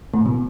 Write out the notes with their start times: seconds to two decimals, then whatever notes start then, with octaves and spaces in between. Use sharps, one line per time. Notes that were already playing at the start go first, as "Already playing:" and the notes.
0.14 A2
0.26 B2